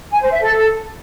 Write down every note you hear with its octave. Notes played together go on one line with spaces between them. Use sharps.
G#5
C5
E5
A4